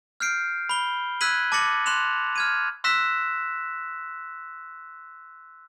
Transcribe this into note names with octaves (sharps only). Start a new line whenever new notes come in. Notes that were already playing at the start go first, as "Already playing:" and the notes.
F6 G6 C7 D7
B5 G7
E6 F#6 G#6 B6 D#7 F#7
A5 D6 A6 A#6 C#7 F#7
C6 F#6 E7 F7
F6 G#6 D#7
C6 E6 F#6 A#6 B6 E7